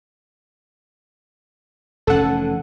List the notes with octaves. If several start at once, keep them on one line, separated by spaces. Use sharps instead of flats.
F1 E3 C#4 A4 F#5